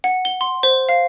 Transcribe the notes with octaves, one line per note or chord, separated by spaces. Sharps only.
F#5
G7
C6
C5
F5